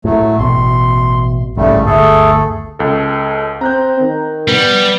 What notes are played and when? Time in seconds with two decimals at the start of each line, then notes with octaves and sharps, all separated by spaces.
0.05 A2 F#3 A3
0.39 A1 B2 C6
1.57 A1 G#2 C#3 G3 A3
1.86 G1 D2 A3 G#4 A4
2.79 C#2 A4
3.61 C4 A#5 F#6 G6
4.01 D#3
4.48 G3 B3 A#6 C#7